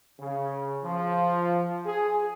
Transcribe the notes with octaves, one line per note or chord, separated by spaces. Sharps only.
C#3
F3
G#4